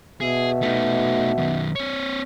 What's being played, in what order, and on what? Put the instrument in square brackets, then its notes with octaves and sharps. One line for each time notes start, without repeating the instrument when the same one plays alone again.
[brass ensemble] B2 E5 [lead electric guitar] G#4
[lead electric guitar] A3 D#4
F#2 D#3
C4 C#5